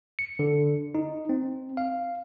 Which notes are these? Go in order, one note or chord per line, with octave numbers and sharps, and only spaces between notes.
C#7
D3
D#4
C4
F5